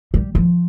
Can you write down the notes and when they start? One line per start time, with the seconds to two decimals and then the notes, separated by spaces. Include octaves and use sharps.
0.14 G3
0.35 F3